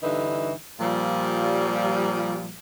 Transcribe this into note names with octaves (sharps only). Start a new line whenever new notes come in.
G2 D3 E3 D#4
A#2 F3 G3